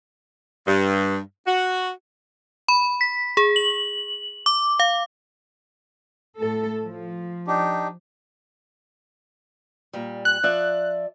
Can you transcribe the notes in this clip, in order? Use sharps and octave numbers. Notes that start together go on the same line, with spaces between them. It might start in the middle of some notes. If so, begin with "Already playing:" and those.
G2
F#4
B5
B6
G#4
F#7
D6
F5
A2 A4
F3
D4 D#4 G4
A#2 G3
F#6
F3 D5 E5